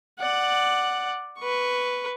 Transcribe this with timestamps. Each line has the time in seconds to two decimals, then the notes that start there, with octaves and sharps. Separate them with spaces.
0.20 D5 F#5
1.39 B4 C#6